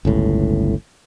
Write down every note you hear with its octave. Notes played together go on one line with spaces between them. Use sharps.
G1 C#2 A2